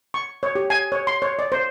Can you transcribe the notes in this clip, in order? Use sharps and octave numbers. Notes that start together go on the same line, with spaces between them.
C#6
C#5
G4
G#5
C#5
C6
C#5
D5
C5